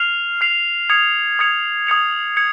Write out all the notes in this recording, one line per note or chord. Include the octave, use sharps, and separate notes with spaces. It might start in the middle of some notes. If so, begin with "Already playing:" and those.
Already playing: F6 C7 F7
F6 C7 F7
D#6 G#6 C#7 F7
D#6 G#6 C#7 F7
D#6 G#6 C#7 F7
D#6 G#6 C#7